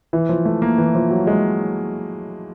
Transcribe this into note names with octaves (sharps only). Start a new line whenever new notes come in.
E3
F3
A3
A#3
E3
F3
F#3
G#3